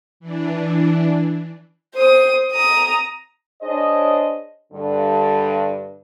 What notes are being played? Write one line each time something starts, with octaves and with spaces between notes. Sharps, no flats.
E3 D4
C5 D#6
A#5 D#6
D4 G#4 C5 C#5 D#5
G2 D3